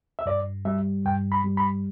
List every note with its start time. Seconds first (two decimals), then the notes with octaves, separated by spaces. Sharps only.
0.19 E5
0.26 G2 D5
0.65 G3 E5
1.06 G2 G5
1.32 B5
1.44 G3
1.57 B5